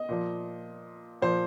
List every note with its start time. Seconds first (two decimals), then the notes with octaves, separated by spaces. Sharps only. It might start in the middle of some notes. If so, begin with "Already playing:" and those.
Already playing: D#5
0.09 A#2 F3
1.22 A#2 F3 C5